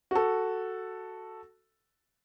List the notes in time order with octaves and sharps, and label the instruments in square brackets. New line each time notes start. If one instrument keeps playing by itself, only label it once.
[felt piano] F#4 A4